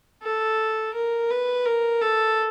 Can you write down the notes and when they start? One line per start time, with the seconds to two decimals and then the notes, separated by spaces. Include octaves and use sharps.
0.22 A4
0.94 A#4
1.30 B4
1.65 A#4
2.01 A4